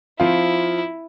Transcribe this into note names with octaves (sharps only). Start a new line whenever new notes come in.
F3 C4 E4 F4